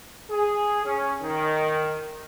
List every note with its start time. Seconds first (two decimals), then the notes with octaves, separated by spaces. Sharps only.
0.30 G#4
0.85 C#4
1.22 D#3